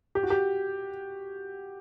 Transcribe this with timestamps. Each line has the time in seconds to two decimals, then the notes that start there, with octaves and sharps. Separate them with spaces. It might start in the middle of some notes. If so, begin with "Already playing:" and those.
0.15 G4
0.23 F#4
0.30 G4